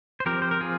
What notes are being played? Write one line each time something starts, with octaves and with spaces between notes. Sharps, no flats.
C5
F3 C4 G4 A#4
C5
A#4
F4 G#4